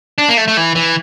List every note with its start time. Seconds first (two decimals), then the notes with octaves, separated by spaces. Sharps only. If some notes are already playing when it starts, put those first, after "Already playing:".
0.18 D4
0.29 A#3
0.37 A3
0.48 A3
0.57 E3
0.75 E3